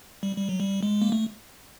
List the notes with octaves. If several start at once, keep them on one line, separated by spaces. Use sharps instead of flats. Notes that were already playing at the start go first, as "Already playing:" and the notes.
G3
G3
F#3
G3
G#3
A#3
A3